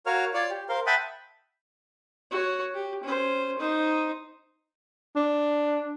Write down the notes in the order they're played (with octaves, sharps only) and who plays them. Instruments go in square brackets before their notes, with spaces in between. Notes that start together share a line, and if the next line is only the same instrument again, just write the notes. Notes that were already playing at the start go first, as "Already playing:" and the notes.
[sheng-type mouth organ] F#4 A#4 C#5 F5 F6
F4 C#5 D5
G4
A#4 C5 F5 C6
E5 F#5 G5 A5 B5 D#6
[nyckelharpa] F#4 C#5
G4
C#4 C5
D#4 C5
[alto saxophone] D4